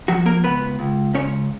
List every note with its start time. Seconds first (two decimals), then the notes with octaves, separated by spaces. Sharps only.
0.08 F3 F#3 F#4
0.26 A#3 A#4
0.44 C#2 B3 B4
0.79 C#2
1.14 C#2 C#4 C#5